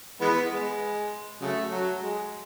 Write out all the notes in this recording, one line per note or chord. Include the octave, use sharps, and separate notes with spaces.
E3 G#3 B3
G#3
C#3 F#3 A3
F#3
G#3